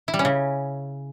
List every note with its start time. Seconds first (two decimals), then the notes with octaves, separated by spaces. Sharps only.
0.08 E4
0.14 G3
0.19 C#4
0.25 C#3